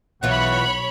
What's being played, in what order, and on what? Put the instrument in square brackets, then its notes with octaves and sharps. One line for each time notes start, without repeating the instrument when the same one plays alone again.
[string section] B1 C#5 B5 [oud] B2 E3 F4 [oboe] F#5